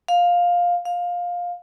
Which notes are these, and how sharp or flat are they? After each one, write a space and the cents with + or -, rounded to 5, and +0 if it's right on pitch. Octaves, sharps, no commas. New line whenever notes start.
F5 +10
F5 +15